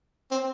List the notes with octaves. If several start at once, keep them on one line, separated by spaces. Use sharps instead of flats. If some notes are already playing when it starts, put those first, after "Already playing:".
C4